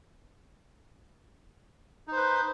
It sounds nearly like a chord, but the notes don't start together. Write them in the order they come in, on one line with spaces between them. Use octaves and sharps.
D#4 C5 B4